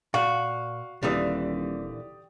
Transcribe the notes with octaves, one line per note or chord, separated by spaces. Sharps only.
A#2 F#4 F5
D#1 A#2 D3 E3 G4 D5 D#6